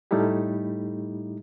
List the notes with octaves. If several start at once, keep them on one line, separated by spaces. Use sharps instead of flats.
A2 G3 A3 D#4 E4 G4